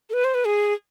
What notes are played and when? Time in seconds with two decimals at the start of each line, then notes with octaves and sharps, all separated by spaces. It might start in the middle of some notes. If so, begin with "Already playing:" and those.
0.10 A4
0.13 B4
0.24 C5
0.34 B4
0.45 G#4